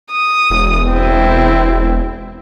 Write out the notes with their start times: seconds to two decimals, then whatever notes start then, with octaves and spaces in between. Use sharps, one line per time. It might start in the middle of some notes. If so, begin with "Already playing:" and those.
0.11 D#6
0.50 E1
0.90 C4 E4